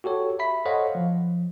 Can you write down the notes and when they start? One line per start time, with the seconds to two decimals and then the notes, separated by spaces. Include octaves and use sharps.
0.04 F#4 G4 A4 C#5
0.39 E5 B5 B6
0.65 A4 C5 C#5 D#5 F5 F#5
0.95 F3